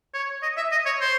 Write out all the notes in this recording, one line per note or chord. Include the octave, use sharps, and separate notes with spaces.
C#5
D#5
E5
D#5
C#5
C5